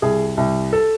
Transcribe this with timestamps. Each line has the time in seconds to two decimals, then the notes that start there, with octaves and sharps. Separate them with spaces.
0.02 C2 G#4
0.37 C2
0.73 A4